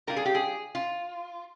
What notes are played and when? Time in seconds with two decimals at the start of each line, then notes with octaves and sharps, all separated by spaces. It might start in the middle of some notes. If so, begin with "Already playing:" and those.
0.07 G3 D4 F4 A#4
0.16 G#4
0.25 G4
0.35 G#4
0.75 F4